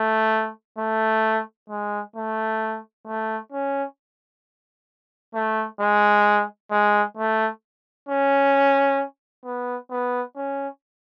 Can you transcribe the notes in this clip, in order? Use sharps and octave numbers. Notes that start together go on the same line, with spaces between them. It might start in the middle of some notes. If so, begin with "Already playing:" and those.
Already playing: A3
A3
G#3
A3
A3
C#4
A3
G#3
G#3
A3
C#4
B3
B3
C#4